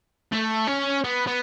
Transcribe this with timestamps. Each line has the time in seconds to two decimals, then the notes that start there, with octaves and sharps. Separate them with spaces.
0.32 A3
0.67 C#4
1.04 B3
1.27 B3